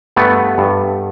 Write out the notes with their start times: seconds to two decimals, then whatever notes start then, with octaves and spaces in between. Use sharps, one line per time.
0.16 G2 A3 B3
0.58 G2